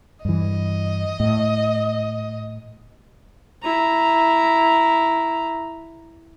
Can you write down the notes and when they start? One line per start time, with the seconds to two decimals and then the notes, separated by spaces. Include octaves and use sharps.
0.25 G2 E3 D#5
1.20 A2
3.63 E4 A#5